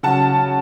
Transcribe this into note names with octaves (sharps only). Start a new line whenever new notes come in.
C#3 F#3 C#4 F#5 A5